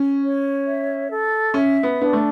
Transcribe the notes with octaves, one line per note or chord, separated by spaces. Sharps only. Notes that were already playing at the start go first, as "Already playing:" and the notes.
Already playing: C#4
C#5
E5
A4
C#4 E5
B3
B3 D4
A3